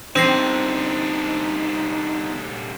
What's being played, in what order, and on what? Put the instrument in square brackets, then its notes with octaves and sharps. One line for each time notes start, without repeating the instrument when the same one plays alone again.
[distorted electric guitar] C2 D3 [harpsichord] C4 [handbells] D4 A#6 C7 [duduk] D#4